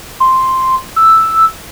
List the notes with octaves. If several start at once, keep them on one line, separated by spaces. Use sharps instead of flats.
C6
E6